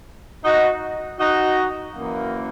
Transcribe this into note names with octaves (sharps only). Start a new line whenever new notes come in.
D#4 F#4
D#4 F#4
F#2 E3 A#3